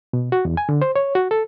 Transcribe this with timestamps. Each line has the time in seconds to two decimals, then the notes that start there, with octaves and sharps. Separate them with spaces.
0.13 B2
0.32 F#4
0.45 E2
0.57 G#5
0.69 D3
0.82 C5
0.96 C#5
1.15 F#4
1.31 A4